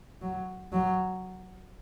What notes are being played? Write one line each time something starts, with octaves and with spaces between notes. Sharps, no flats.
F#3
F#3